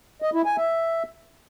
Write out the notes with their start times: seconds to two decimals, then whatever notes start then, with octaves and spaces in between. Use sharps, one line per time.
0.22 D#5
0.34 E4
0.46 G#5
0.57 E5